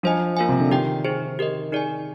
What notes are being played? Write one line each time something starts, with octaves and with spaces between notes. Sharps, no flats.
F3 D4 F4 C5 D#5 G#5
A#3 F4 A#4 F5 G#5
C3
D3
D#3 G4 D5 G5
D#4 G#4 C5
G4 A#4 D#5
D#4 G#4 D5 G#5